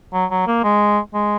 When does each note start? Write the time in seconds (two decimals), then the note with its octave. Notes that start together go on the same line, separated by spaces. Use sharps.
0.13 F#3
0.31 F#3
0.47 A#3
0.64 G#3
1.14 G#3